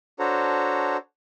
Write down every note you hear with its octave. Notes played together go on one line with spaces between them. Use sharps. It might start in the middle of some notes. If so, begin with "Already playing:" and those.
D4 F#4 A4 C5 C#5 A#5